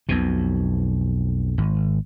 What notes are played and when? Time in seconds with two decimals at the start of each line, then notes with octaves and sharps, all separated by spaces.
0.09 B1 F2 B2
1.58 G#1